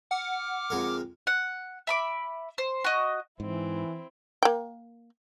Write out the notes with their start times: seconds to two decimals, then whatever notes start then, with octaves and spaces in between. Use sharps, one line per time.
0.11 F#5 D6 F6
0.70 F2 G#3 A#4
1.27 F#5
1.87 E5 B5 D6
2.58 C5
2.84 F#4 D#5
3.40 G#2 E3 C4 E4
4.43 A#3 G5